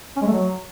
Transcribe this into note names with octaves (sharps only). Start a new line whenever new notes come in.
C#4
G#3
A3
F#3